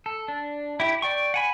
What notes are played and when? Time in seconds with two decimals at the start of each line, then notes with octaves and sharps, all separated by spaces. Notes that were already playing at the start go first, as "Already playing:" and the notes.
0.06 A4
0.28 D4
0.80 E4 G4
1.02 D5 G5 C#6
1.34 F#5 G#5 B5